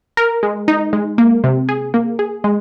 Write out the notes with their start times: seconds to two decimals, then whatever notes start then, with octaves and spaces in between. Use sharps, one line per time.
0.17 A#4
0.43 G#3
0.68 D#4
0.93 G#3
1.18 A#3
1.44 C3
1.69 G#4
1.94 A#3
2.19 G#4
2.44 G#3